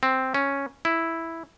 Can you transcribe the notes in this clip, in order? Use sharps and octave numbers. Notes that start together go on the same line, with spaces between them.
C4
C#4
E4